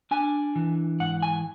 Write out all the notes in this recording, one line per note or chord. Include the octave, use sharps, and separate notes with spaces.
D4 G#5
E3
G#2 F#5
G#5